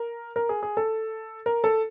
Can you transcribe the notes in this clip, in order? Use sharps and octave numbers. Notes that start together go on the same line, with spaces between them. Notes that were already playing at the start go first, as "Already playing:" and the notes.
Already playing: A#4
A#4
G#4
G#4
A4
A#4
A4